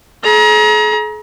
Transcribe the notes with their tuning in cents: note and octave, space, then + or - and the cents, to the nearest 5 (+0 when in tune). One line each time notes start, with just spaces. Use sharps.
G#4 +45 A#5 +35